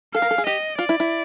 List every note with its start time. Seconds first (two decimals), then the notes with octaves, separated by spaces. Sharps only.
0.14 A4 F5
0.22 A#4
0.31 A4
0.38 G#4
0.46 G4 D#5
0.78 F4 D5
0.89 E4
1.00 E4